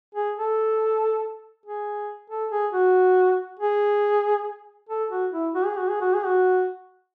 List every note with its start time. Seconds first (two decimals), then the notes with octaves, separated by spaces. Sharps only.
0.15 G#4
0.36 A4
1.66 G#4
2.30 A4
2.51 G#4
2.73 F#4
3.59 G#4
4.89 A4
5.11 F#4
5.32 E4
5.55 F#4
5.65 G#4
5.78 F#4
5.89 G#4
6.01 F#4
6.14 G#4
6.25 F#4